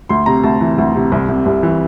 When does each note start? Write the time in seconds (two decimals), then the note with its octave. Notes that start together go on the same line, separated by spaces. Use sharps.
0.09 D2 C6
0.26 C3 A#5
0.44 D2 A5
0.61 E3
0.78 D2
0.95 C3
1.12 C2
1.29 C3
1.46 C2
1.63 E3